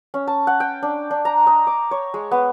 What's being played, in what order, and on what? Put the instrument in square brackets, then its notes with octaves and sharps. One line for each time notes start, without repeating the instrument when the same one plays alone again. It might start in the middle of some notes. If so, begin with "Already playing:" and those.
[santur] C#4
A5
F#5
G5
D4
D4
A#5
D#5
D6
C#5
G#3
B3